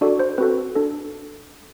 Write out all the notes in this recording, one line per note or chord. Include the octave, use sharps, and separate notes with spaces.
D4 F#4 A4 D5
C5
C4 F#4 A4 B4
D4 A4